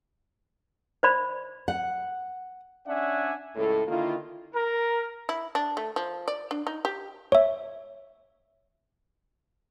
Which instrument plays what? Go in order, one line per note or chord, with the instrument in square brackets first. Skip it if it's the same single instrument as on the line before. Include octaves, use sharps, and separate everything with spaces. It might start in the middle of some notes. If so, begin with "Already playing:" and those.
[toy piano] C5 D5 B5
[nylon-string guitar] F#5
[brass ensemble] C#4 D4 D5 E5 F#5 G#5
C#2 A2 A4
D3 D#3 A#3 E4 F4
[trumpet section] A#4
[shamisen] E4
D4
A3
F3
D5
D4
D#4
G4
[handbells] C#5 E5